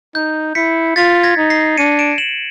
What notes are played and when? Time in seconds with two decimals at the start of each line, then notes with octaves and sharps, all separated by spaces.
0.15 D#4 G6
0.55 E4 B6 C#7
0.96 F4 A6 B6
1.23 G#6 A#6
1.37 D#4
1.50 A#6 C7
1.77 D4 C#7 D#7
1.99 D7 E7
2.18 E7 F#7